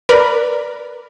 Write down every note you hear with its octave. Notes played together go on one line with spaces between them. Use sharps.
A#4 B4 D5 B5